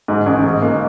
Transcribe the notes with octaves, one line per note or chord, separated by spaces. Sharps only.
G#2
A1
G#2
A#3